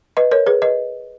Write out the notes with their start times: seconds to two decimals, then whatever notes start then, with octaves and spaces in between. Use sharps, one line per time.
0.17 B4 D#5
0.32 A#4 C#5
0.46 G#4 B4
0.62 B4 D#5